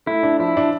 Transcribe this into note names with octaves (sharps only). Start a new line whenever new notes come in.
A3 E4
D4
F3 E4
D4